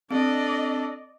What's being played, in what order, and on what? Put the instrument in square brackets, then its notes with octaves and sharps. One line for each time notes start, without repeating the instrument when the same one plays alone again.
[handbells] C4 [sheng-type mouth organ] D4 A4 [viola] D5 D#5